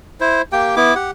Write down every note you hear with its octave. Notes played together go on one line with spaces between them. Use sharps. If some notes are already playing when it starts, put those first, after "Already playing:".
E4 C5
A#3 G4 G5
B3 E4 D6
G4 F#5